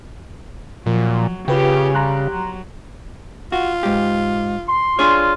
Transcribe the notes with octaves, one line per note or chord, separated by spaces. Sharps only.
A#2 F3 F#3
C#3 F4 G4 B4 C#5 G5
G3 G4 A#5 C6 F#6
F#3
F4 F#4
G#2 G4
C6
D4 F4 G#4 C#5